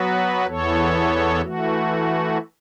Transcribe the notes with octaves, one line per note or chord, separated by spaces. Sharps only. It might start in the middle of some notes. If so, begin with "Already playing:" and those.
Already playing: F#3 B3 F#4 B4
E2 E3 B3 A4 C#5
E3 A3 F#4